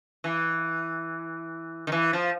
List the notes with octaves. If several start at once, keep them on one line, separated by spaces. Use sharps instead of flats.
E3
D#3
E3
F3